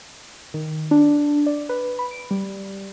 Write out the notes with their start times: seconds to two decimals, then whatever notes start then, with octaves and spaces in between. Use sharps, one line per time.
0.54 D#3
0.91 D4
1.46 D5
1.69 B4
1.99 B5
2.11 D7
2.31 G3